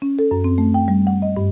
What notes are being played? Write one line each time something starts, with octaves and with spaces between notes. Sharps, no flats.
C#4
A4
F#2
C4
A3
G5
G3
F#5
D#5
G2